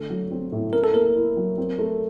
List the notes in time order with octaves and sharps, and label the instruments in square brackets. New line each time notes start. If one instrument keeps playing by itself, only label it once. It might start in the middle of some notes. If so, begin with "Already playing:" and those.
Already playing: [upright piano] D3 A3
F#3
C4
A2
[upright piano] C#4 [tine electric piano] A#4
[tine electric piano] A4
[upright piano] A#3 [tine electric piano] A#4
[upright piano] E4
F#3
C4
A3